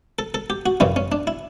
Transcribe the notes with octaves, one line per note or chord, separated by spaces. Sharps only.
A4
A4
G4
F#4
F#2 C#3 E3 G3 C#4
C#4
D4
E4